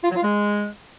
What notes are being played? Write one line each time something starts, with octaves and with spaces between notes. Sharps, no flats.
F4
F#3
F4
G#3